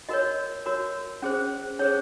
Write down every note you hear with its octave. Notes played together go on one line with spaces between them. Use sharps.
F#4 A#4 C#5 D#5
F#4 A#4 C#5
C#4 G#4 C5
C#4 G#4 C5 C#5